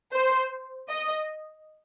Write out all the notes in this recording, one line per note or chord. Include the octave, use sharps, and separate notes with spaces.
C5
D#5